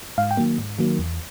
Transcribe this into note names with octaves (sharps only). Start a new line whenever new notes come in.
G#2 F5
G5
D#3 F#3 A#3
G#2
D#3 F#3 A#3
E2